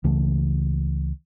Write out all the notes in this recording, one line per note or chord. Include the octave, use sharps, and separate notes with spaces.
C#2 C#3 E3 A3